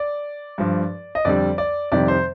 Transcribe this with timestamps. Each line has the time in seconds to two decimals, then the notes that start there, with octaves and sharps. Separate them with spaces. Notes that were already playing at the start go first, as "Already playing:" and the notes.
Already playing: D5
0.58 G2 F3
1.15 D#5
1.25 F2 D3 G3 D5
1.58 D5
1.92 F2 C3 D#3 G3 D5
2.08 C5